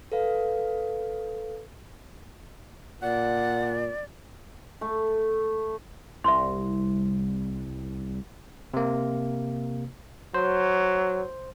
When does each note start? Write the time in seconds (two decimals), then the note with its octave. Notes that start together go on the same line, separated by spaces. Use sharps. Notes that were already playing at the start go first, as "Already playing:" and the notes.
0.12 A4 B4 F5
3.02 A#2 D5 F#5
4.81 A3
6.24 C2 E5 C6
8.74 C3 A#3
10.34 F#3 C5